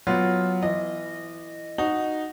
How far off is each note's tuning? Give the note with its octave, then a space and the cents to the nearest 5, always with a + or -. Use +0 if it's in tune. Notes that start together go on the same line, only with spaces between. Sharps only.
F#3 +0 B3 +0 F4 +0
E3 +15 D#5 -20
D#4 -10 F#4 +0